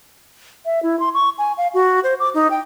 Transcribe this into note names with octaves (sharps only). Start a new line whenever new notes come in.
E5
E4
C6
C#6
G#5
F5
F#4
C5
D6
D#4
G5